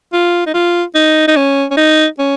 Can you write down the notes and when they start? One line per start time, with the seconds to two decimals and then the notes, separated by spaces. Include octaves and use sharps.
0.13 F4
0.46 D#4
0.54 F4
0.95 D#4
1.28 D#4
1.36 C#4
1.71 C#4
1.77 D#4
2.19 C#4